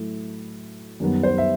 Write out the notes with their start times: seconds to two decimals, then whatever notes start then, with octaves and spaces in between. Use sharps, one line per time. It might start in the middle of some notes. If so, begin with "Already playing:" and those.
Already playing: A2 F#3 A3 E4
1.00 F#2 D#3 G3 B3
1.23 C5
1.38 E5